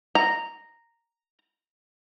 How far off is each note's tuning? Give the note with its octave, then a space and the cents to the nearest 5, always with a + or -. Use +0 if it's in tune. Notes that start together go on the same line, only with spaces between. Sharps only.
A#5 -5